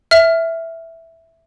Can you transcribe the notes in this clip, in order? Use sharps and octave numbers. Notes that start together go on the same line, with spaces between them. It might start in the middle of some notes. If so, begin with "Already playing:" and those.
E5 F6